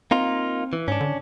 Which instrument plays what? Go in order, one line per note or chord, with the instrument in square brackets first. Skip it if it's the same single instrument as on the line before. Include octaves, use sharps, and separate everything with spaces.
[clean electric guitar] A#3 D#4 F4 [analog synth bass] C4
[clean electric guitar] E3
[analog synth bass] G#2 [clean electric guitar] C#4 D4
[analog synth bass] D3